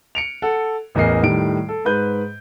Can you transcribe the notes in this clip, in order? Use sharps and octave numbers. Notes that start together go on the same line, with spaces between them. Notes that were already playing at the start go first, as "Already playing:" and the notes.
C#7 D7 F7
A4 F#5
A1 E2 A#4 D#5 C7
A2 D#3 G3 D7
A4
G#2 B4 G6